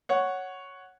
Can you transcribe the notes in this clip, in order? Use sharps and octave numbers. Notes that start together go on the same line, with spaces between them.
C#5 F#5